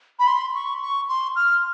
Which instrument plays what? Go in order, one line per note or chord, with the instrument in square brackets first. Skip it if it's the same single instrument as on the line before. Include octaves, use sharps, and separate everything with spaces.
[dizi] B5
C6
C#6
C#6
C6
F6